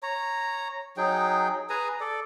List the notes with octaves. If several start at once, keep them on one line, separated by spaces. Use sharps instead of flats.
C#5 A#5
F#3 D#4 G#4 G5
G#4 B4 G#5 A#5
A4 D5